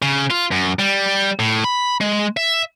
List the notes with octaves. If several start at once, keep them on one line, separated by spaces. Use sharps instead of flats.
C#3
F4
F#2
G3
A2
B5
G#3
E5